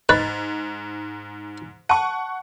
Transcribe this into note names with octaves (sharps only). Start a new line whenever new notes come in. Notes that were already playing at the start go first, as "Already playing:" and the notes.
G#2 B4 D#5
F#5 A5 C#6